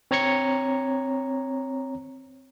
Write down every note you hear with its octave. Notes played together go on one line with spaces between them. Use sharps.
C4 C#5 A#5 G#6 C#7